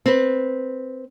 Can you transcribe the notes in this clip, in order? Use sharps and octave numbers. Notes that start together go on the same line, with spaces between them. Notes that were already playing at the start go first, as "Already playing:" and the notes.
C4 B4